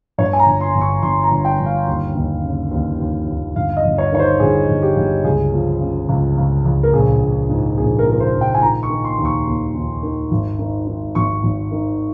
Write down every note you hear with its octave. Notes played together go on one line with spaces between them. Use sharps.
G2 C#5
G#5
A#5
G1
C6
G1
C#6
G1 C6
A#5
G1
G5
G2
F5
D#2
D#2
C#3
D#2
D#2
D#2
G1 F5
F5
D#5
G1
C#5
D#3 C#5
C5
G1 G#4
G1
G4
G1
C#2 G#4
F3
C#3
C#2
C#2
C#2
A#4
A#1 G#4
A#1
G#2
A#1 G#4
A#4
F3
A#4
C5
A#1
G5
G#5
D#3 A#5
C#6
D#3
C6
D#2
C#6
D#2
D#2
D#3
G#1
D#3
D#3
G#1 C#6
G#1
D#3